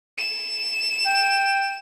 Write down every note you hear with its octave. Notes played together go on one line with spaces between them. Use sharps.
E7
G5